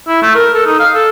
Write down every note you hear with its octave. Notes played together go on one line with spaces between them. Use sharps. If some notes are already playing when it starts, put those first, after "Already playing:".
E4
A3
A#4
A4
D#4
F5
A4